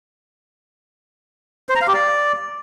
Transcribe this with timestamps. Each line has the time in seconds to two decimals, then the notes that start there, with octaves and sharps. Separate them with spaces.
1.69 C5
1.75 A#5
1.81 F5
1.88 G4
1.94 D5